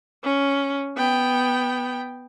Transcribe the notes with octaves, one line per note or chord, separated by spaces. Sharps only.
C#4
B3 G5